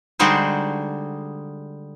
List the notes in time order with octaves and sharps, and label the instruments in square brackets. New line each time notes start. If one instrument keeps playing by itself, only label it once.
[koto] D3 G3 G#3 D#4 F#4 C5